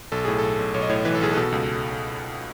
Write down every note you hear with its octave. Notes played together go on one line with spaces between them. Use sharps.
B1 A4
A2 G#4
B1 A4
B1
B1 C#5
D#5
A2 C#5
E3 B4
A4
B1 G#4
B2 A4
C#2